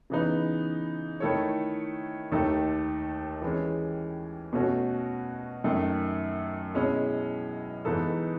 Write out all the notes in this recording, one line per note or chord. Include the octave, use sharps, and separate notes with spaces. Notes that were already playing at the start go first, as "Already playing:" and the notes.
C#3 E3 B3 D#4
D#3 A3 E4 A4 C#5
D#2 D#3 A3 D#4 A4
E3 G#3 C#4
B2 A3 C#4 F#4 A4
F#2 D#3 A3
B2 G#3 C#4 E4
G#2 E3 B3 D#4 A4